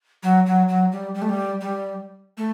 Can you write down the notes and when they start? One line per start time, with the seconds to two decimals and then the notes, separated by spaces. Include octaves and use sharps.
0.23 F#3
0.46 F#3
0.68 F#3
0.92 G3
1.15 G3
1.22 A3
1.29 G3
1.61 G3
2.37 A3